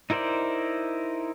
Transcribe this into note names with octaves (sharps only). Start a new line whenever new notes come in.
D#4 E4 A#4 C5 D5